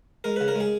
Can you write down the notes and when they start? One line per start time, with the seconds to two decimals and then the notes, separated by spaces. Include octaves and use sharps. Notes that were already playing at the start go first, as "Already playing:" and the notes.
0.24 G#3 A#4
0.36 C#3 B4
0.48 A#4
0.55 G#3 G#4